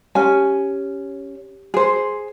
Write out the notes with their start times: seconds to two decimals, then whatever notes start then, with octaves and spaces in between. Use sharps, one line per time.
0.15 C#4 G4 G#5
1.74 G#4 C5